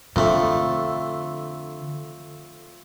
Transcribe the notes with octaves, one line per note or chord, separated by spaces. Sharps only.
F2 D3 A3